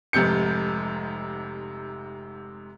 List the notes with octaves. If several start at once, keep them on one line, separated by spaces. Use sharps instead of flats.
F1 G#2 C3 G6 C#7